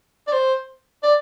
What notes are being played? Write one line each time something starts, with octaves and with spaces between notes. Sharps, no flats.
D5
C5
D5